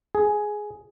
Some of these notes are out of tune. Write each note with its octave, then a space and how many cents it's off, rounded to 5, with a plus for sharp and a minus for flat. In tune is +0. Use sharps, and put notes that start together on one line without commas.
G#4 +10